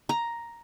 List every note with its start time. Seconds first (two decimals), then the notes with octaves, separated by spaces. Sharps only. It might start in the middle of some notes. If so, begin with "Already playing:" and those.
0.09 A#5